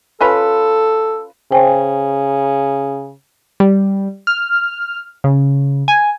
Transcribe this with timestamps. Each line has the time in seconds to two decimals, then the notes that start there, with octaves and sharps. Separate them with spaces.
0.21 C#4 F4 A4 B4
1.52 C#3 C5 G5 G#5
3.60 G3
4.27 F6
5.24 C#3
5.88 G#5